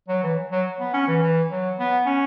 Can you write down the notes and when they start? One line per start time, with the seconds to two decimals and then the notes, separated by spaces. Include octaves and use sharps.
0.08 F#3
0.23 E3
0.52 F#3
0.80 B3
0.94 C#4
1.07 E3
1.22 E3
1.51 F#3
1.79 B3
2.06 C#4